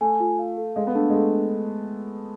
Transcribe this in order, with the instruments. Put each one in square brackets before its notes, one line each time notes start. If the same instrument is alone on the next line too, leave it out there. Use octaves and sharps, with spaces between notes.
[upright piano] A3 [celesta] G#5
[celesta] F4
F5
A4
[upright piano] G#3 [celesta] F5
[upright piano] B3
[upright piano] A3 [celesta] D4
[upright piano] G#3
[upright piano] A3 [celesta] A4